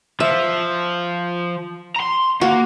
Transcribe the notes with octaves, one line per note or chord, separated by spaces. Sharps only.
F3 E5
A#5 C6
A#3 F#4